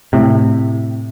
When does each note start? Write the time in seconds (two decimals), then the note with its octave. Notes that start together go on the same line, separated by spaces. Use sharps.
0.13 A2 C3